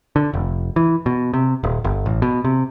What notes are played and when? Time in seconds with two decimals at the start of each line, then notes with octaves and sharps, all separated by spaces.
0.16 D3
0.34 F1
0.76 E3
1.06 B2
1.33 C3
1.63 D#1
1.84 G1
2.06 A1
2.22 B2
2.45 C3